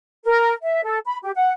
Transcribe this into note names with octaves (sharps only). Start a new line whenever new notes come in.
A#4
E5
A4
B5
G4
F#5